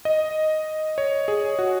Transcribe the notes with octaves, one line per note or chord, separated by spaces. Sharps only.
D#5
C#5
G#4
F#4